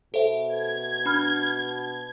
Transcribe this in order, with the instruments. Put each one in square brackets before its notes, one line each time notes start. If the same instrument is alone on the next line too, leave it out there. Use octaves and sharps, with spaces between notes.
[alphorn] B2 [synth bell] A4 C5 E5
[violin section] G#6
[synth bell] D4 B5 F6